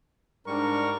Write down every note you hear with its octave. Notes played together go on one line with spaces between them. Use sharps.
G#2 G3 D4 A#4 C#6